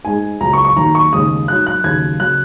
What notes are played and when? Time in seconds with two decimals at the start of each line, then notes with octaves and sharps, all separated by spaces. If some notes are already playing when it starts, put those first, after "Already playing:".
0.05 G#2 G#3 G#5
0.40 C#2 C#3 F#3 A#5
0.53 C#6
0.65 C#6
0.76 D#2 D#3 F#3 A#5
0.95 C#6
1.12 D#2 C#3 G#3 D#6
1.48 G#2 F#3 F#6
1.66 F#6
1.84 D#2 C#3 F#3 G#6
2.20 C#3 F#3 F#6